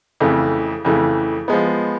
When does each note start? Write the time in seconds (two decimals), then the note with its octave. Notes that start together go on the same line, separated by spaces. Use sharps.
0.20 F2 C#3 E3 A3
0.85 F2 C#3 E3 A3
1.48 F3 G#3 B3